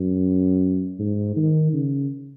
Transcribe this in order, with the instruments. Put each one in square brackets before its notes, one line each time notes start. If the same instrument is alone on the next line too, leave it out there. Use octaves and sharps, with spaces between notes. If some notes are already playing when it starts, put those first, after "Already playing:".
Already playing: [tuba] F#2
G#2
D#3
C#3